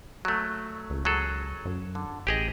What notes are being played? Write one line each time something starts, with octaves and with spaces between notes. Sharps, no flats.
F#3 A3
C#2
F#3 G#4 A4
F#2
D3
A1 G4 G#4 D#5